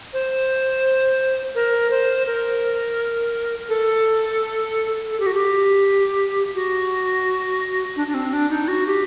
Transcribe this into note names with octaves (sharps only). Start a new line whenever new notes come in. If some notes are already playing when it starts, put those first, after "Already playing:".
C5
A#4
C5
A#4
A4
A4
G4
F#4
G4
F#4
D4
D4
C4
D4
D#4
F#4
G4